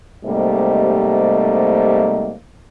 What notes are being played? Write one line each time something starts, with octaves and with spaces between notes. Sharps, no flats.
G#2 C3 G3 A3 A#3 D#5